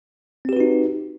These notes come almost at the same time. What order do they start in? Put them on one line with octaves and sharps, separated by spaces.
C4 G4 B4 F#4 D#4